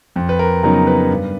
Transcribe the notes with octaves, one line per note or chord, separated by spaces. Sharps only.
F2
B4
A#4
C#3 F#3 B3 D#4 A#4
B4
G2